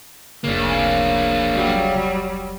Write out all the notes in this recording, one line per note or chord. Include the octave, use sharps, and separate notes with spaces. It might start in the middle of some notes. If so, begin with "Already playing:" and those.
F1 C#2 C#3 A#3 D4
F#3 G3